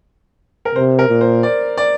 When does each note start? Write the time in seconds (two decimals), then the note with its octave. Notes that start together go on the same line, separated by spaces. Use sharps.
0.65 A#4
0.75 C3 C5
0.99 A#4
1.09 A#2
1.21 C5
1.43 D5
1.77 D5